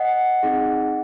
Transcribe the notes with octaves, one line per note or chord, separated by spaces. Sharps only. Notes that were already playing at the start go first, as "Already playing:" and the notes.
Already playing: D#5 F#5
C4 D#4 G#4